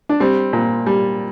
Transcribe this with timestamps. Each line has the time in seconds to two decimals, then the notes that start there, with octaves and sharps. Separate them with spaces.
0.09 D4
0.20 G3 C4
0.53 A#2
0.86 G3